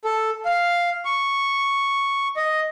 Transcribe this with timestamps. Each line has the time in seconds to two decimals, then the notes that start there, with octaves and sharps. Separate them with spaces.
0.05 A4
0.45 F5
1.05 C#6
2.37 D#5